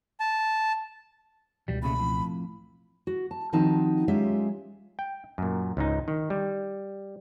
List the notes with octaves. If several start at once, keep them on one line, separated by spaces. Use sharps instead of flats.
A5
C#2 B2 E3 G3
A#2 C#3 A3 B5
F2 A2
F#4
A5
D#3 F3 C4 D#4 F#4 A5
F#3 G#3 C#4 F4 G4 E5
G5
F#2 A#2
C#2 G#2 D#4
D#3
G3